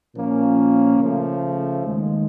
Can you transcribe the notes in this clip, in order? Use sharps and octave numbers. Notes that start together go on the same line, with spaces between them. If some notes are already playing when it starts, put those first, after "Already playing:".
A#2 F3 A#3 C#4
C#3 F3 A3
D#2 D#3 G#3